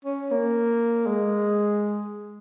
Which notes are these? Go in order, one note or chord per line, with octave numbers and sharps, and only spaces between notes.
C#4
A#3
G#3